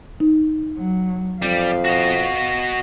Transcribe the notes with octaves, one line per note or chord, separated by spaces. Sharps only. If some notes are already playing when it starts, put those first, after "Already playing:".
D#4
F#3
F2 G3 F5
F#4 D#5